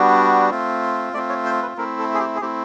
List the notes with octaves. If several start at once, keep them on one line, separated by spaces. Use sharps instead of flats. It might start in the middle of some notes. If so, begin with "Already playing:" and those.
Already playing: G3 B3 D4 F#4
A3 C4 F4
A3 C4 F4 D5
C#5
C5
B4
A3 C4 E4 A#4
A4
G#4
G4
G#4
A3 C4 E4 G4